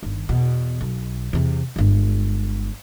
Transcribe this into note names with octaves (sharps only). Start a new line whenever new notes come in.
G1 D#3
E2 B2
B1
E2 C3
G1 G#3